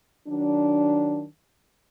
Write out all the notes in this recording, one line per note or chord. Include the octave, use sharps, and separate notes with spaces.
D#3 F#3 D4